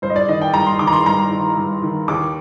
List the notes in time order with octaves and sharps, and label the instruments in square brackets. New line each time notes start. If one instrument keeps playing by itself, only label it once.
[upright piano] G2 C5
D#5
D5
D#3 D#5
G5
G2 A#5
C6
D#3 D6
A#5
C6
G2 A#5
D#3
G2
D#3
D#2 D6